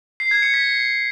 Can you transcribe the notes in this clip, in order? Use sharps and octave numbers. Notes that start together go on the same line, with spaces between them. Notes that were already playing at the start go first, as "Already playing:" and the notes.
C7
G#6
C#7
B6